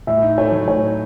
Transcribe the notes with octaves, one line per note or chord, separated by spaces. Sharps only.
A2 E5
D#4
A3 C#5
F#3
A2 C#5
D#4